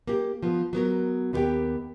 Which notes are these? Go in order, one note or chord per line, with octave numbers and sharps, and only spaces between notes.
A#3 G4
F3 B3
F#3 B3 A#4
D#2 B3 F4 G4 A#4 G5